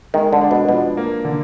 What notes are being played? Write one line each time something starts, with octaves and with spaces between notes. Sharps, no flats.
D#3 G#3
D3
D4
B2
B2 F3
A#3
D3